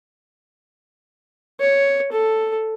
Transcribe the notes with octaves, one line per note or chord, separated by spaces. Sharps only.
C#5
A4